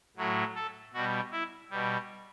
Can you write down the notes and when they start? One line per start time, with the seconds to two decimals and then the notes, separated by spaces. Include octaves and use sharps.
0.17 A2 F#3 A3
0.55 A4
0.93 B2 G3 F#4
1.32 E4
1.70 B2 G3